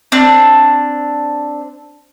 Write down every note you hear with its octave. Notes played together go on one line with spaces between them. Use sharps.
C4 D4